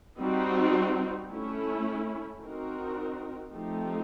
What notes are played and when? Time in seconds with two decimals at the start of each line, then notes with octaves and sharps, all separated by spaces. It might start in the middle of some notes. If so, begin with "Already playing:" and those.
0.19 G3 C4 D#4 F#4
1.31 A3 C#4 E4
2.41 C4 D#4 F#4 A#4
3.52 F3 A3 C4 D#4 G4